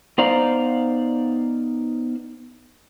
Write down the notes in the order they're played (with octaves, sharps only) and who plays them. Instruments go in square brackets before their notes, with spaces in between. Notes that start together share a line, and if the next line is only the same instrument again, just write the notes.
[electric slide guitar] B3 D#4 C5 D5 F5 A#5